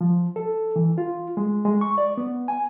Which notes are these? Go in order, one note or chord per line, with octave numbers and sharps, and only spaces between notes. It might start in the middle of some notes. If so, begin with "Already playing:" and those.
F3
A4
E3
F4
G#3
G#3
C#6
D5
B3
G#5